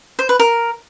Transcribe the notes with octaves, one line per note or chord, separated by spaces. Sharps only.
C5
B4
A#4